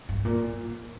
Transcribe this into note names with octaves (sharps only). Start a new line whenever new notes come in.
G2
A#2